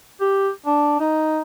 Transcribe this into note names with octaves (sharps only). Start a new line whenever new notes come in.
G4
D4
D#4